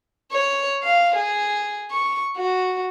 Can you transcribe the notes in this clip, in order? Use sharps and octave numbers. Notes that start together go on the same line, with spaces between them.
C#5
F5
G#4
C#6
F#4